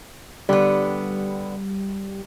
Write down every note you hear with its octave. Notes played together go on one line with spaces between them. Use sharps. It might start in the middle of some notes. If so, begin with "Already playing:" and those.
D3 G3 B3